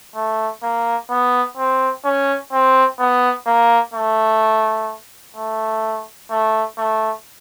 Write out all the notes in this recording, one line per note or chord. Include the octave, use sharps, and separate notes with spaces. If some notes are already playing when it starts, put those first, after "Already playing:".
A3
A#3
B3
C4
C#4
C4
B3
A#3
A3
A3
A3
A3